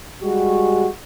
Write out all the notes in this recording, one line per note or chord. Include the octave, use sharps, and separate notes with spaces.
G3 G#3 F#4